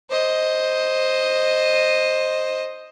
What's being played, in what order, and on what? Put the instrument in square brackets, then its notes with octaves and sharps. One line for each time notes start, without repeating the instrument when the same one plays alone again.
[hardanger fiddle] C5 D#5